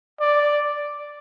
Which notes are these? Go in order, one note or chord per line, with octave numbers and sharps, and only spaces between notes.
D5